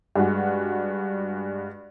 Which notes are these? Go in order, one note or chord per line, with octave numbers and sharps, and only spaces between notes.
G2 G#3 F#4